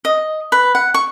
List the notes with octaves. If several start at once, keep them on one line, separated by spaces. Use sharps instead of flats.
D#5
B4
F#5
C#6